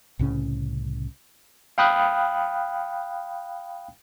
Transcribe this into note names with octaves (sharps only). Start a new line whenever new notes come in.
C2 A2 C#3 C#4
F5 G5 B5 D#6 F#6